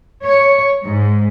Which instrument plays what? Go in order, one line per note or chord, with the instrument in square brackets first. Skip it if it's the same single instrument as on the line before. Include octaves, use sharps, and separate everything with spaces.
[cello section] C#5
G#2